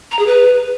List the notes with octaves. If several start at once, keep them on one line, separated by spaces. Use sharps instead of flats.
A#5
G#4
B4